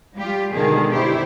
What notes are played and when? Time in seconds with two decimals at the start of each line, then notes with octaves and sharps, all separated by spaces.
0.17 G3 F4 G4
0.52 B2 D3 D#3 G#3 G#4
0.93 E4 G4 C5